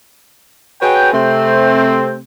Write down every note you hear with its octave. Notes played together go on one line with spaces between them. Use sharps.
F#4 G#4 B4 C#5 G5
C3 A3 C4